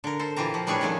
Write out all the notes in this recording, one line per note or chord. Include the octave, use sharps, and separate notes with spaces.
D3 A#4
A4 C5
A#2 E3 F4 G4 A#5
F3
A2 G3 D4 G#4 B4 C#5
C3 D#3 F3 C#4 A4